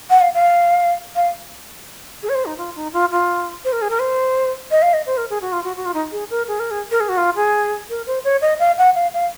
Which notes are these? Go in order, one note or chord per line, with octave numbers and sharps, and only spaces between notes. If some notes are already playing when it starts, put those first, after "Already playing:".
F#5
F5
F5
F5
G#4
C#5
C5
D#4
F4
D#4
F4
F4
C5
A#4
G#4
A#4
C5
D#5
F5
D#5
C5
A#4
G#4
F#4
F4
F#4
F#4
F4
D#4
G#4
A#4
G#4
A#4
G#4
A#4
G#4
F#4
F4
G#4
A#4
C5
C#5
D#5
F5
F#5
F5
F5